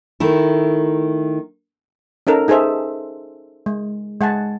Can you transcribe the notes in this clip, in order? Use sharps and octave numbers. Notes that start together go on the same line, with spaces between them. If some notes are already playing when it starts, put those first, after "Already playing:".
D#3 A3 E4
C#4 D#4 A4 A#4
D#4 G#4 A4 C5 E5
G#3
G#3 F#5 G#5 A5